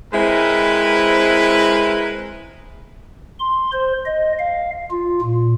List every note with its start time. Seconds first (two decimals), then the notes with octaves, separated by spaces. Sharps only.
0.14 G#3 C4 E4 A#4 B4
3.39 C6
3.72 C5
4.06 D#5
4.39 F5
4.90 F4
5.21 A#2